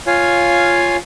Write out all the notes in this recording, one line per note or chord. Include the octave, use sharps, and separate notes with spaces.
F4 C#5 F5 G#5